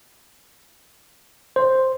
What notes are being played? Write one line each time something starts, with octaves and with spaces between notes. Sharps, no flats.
C5